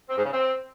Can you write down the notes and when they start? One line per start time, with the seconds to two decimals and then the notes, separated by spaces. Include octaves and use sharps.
0.09 C4
0.16 G#2
0.24 C#3
0.32 C4